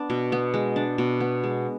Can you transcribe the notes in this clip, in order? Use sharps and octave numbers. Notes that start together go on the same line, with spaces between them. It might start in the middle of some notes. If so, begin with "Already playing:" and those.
Already playing: B3 D4
B2
B3
G#3
D4
B2
B3
G#3